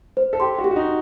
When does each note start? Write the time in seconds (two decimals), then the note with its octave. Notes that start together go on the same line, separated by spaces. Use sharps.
0.17 C5
0.33 A4
0.40 G4 C6
0.58 F#4
0.64 G4
0.71 F#4
0.76 D#4